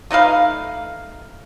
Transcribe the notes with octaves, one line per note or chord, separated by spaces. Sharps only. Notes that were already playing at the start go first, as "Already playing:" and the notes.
A3 D#4 B4 F5